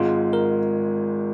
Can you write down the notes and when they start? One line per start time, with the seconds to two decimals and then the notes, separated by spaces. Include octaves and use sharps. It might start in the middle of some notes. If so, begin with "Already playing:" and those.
Already playing: G#1 G#2 G#3 F4
0.33 A#4